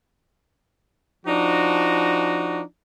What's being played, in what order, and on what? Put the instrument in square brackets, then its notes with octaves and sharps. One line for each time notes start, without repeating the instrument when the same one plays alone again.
[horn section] F3 D4 D#4 F#4